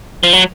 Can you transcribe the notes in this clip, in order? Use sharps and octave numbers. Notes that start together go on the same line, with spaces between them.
F3
F#3